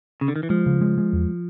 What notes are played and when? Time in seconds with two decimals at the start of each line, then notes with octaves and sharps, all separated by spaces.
0.21 C#3
0.28 D3
0.36 D#3
0.43 E3
0.50 F3 G#3
0.66 C#3
0.81 G#3
0.98 G#3
1.13 E2